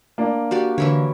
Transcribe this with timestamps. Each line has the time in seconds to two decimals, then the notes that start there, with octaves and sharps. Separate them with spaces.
0.18 A#3 D4
0.51 F#4 G4 D5
0.78 D3 E3 E4 C#5